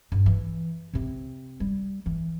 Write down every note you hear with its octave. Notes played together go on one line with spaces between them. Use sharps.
G2
E3
C3 C4
G3
E3